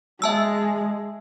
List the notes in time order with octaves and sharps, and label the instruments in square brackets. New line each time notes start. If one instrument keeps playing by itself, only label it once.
[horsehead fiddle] G#3 [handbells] E5 A5 E6